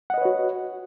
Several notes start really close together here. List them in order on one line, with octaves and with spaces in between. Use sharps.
F#5 D#5 B4 C#5 F#4